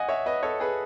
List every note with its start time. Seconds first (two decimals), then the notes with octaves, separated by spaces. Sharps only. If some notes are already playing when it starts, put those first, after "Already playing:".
Already playing: D#5 F#5 G#5
0.08 C#5 E5
0.26 B4 D#5
0.43 A4 C#5
0.60 G#4 B4